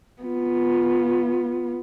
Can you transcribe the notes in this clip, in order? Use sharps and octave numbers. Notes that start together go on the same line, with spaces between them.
B3 F4